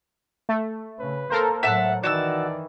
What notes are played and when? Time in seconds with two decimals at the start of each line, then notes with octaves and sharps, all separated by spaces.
0.49 A3
1.00 C#3 B4
1.30 A#3 A4 A#4 C5
1.63 A2 F#3 E5 F#5 A5 F#6
2.04 D#3 E3 F#4 D5 A5 E6